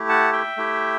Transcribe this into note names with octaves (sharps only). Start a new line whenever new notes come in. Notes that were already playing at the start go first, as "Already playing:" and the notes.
Already playing: A3 E4 G4
F#5 A5
E5 G5
A3 E4 G4